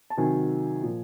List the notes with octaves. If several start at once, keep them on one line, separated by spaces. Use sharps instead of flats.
A5
C3 D#3 F#3 G#5
A#2 F3